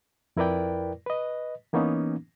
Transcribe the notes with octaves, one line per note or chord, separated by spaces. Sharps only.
F2 E4 A#4 B4 D5 G5
B4 D#5
E3 A#3 B3 C#4 D#4